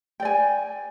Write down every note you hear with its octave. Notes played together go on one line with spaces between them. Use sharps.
D5 G5 G#5